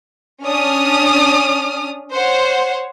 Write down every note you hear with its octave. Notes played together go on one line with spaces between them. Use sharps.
C#4 D4 D#6 F6
C5 C#5 F#5